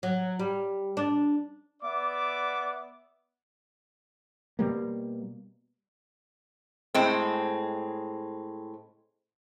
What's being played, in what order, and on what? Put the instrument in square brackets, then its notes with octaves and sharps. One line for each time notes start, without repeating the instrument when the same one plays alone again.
[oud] F#3
G3
D4
[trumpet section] B3 D5 E5 D6
[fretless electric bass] B2 G3 A#3
[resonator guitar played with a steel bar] A2 G#3 C4